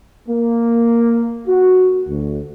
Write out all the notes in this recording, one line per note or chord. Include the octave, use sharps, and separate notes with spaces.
A#3
F#4
D2